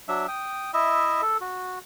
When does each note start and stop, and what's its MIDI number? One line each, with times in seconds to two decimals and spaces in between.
0.08 0.27 54
0.08 0.27 62
0.08 0.27 76
0.28 0.71 79
0.28 0.71 87
0.74 1.21 64
0.74 1.21 75
0.74 1.21 76
1.22 1.37 69
1.41 1.79 66